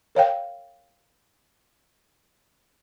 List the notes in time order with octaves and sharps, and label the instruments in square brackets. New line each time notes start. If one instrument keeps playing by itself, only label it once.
[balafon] A#4 C#5 F5 G5